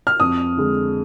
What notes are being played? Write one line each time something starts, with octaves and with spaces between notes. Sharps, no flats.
F6
F2 D#6
D3 G#3